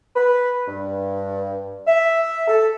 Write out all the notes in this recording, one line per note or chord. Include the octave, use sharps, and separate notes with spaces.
B4
G2
E5
A4